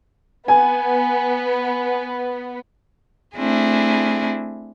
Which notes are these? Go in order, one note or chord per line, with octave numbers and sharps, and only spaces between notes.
B3 G#5
A3 C4 D4 E4 G#4